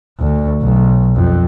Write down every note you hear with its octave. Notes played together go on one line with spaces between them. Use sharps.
D2
B1
F2